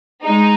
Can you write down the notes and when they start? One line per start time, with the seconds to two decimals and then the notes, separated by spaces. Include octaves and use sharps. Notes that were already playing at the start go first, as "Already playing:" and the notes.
0.23 G#3 D#4